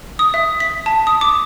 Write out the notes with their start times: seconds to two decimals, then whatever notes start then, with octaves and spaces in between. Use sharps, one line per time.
0.19 D#6
0.34 E5
0.60 B6
0.86 A5
1.07 D#6
1.21 D6